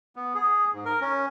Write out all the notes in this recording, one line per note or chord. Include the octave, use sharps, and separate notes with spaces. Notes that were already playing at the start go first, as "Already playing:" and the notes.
B3
G#4
G#2
A#4
C#4